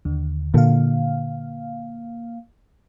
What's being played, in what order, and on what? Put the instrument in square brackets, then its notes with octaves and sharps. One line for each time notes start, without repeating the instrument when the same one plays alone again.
[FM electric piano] D#2 D3
[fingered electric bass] A#2 D3 [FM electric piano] A#3 F5